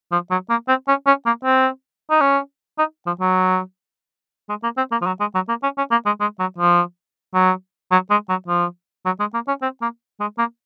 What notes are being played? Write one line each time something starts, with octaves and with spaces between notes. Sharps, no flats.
F3
F#3
A#3
C4
C#4
C#4
A#3
C4
D#4
C#4
D#4
F3
F#3
G#3
A#3
C4
A#3
F3
F#3
G#3
F#3
A#3
C#4
C#4
A#3
G#3
G#3
F#3
F3
F#3
F#3
G#3
F#3
F3
F#3
G#3
A#3
C#4
C4
A#3
G#3
A#3